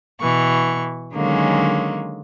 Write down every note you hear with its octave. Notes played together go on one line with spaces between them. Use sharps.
B2 E3 C#6
D3 D#3 F#3 G#3 A#3 C#4